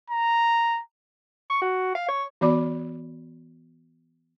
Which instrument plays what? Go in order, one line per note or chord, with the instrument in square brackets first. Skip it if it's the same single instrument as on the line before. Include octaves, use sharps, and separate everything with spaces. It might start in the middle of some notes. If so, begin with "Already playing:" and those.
[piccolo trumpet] A#5
[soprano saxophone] C#6
F#4
F5
C#5
[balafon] E3 B3 F#4 D5 B5 D6